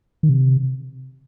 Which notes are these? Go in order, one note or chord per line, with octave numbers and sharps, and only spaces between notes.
D#3
C3